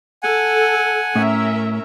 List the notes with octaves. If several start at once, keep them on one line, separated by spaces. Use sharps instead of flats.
A4 F#5 G#5
A2 C#4 A#4 E5